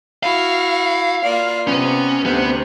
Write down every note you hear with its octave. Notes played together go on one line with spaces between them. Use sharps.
E4 F#4 F5
A#3 F4 D5
C3 B3 C#4
D2 C3 B3